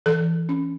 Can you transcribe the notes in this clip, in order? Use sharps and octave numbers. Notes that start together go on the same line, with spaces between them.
E3 A4
C#4